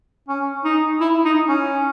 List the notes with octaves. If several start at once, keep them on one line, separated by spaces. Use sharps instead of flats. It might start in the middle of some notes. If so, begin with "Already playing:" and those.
C#4
D#4
E4
D#4
C#4